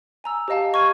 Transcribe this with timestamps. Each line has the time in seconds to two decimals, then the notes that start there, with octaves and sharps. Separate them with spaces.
0.24 G#5 A#5 E6
0.48 G4 C5 D#5 F5 A5
0.73 D#5 C#6 F6 G#6 D#7